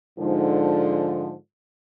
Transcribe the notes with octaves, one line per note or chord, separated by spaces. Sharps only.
G#2 D3 F3